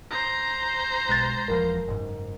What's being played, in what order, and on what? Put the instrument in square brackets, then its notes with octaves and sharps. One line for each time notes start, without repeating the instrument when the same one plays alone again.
[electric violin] C5 A#5
[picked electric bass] B1 [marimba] G#3 F#6 A6
[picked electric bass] F1 E2 F3 [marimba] A#4
[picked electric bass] F#1 G#2